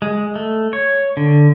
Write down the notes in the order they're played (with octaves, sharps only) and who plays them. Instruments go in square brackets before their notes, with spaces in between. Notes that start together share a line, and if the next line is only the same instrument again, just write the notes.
[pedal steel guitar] G#3
A3
C#5
D3